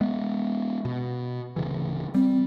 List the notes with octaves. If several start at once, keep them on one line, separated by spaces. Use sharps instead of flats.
G#3 B3
B2
D1 C#3 E3
G3 C4